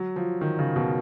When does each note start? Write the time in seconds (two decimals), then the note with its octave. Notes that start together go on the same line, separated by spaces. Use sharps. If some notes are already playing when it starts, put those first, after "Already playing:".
Already playing: F#3
0.16 F3
0.41 D#3
0.59 C#3
0.76 B2